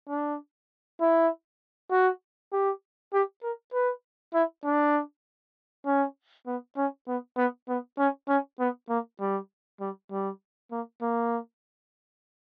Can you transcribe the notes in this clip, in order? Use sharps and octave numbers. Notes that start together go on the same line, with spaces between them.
D4
E4
F#4
G4
G4
A#4
B4
E4
D4
C#4
B3
C#4
B3
B3
B3
C#4
C#4
B3
A#3
G3
G3
G3
A#3
A#3